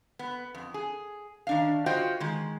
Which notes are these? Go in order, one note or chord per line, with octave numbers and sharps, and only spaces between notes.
B3
F2
G#4
D#3 D4 F5
F4 F#4 C5 D#5 F5 G5
D#3 G#3